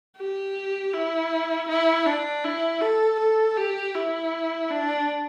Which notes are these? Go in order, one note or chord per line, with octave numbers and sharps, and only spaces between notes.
G4
E4
E4
D4
E4
A4
A4
G4
E4
D4